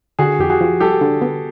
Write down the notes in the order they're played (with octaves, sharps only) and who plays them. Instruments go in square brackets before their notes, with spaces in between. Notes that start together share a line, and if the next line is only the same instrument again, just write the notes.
[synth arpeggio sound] D3 [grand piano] F#4 G#4
[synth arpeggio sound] F2 [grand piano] G4
[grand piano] F#4 G#4
[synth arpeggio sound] F3
[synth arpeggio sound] G3 [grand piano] G4 A4
[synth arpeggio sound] D3
B3